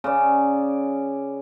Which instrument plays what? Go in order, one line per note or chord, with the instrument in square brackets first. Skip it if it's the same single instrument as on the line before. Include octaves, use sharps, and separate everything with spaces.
[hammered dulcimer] C#3 D5